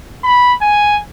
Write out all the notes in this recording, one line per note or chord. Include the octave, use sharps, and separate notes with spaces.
B5
G#5